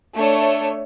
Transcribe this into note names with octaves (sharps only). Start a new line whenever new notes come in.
A3 D4 A4 C#5